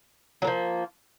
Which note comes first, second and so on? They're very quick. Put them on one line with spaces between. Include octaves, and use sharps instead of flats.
F#3 A#3 F3